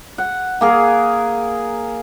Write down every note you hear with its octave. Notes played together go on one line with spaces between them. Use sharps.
F#5
A#3 G#4 A#4